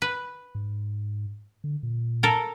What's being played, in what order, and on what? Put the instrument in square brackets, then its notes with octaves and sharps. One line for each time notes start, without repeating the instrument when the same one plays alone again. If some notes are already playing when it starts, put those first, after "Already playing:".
[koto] B4
[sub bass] G#2
D3
A#2
[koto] A4 A#4